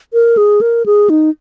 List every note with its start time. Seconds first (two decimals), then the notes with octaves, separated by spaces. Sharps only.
0.13 A#4
0.37 G#4
0.61 A#4
0.86 G#4
1.10 D#4